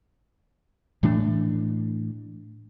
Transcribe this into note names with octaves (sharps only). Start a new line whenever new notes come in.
A2 E3 A3 D4